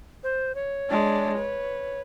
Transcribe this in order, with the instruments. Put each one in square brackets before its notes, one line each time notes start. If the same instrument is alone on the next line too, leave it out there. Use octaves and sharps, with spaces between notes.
[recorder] C5
C#5
[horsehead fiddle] G#3 D4
B4